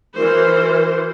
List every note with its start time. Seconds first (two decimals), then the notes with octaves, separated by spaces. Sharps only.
0.16 E3 F#4 A#4 C5